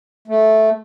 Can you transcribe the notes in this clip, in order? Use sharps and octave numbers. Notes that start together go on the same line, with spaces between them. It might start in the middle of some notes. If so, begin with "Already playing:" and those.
A3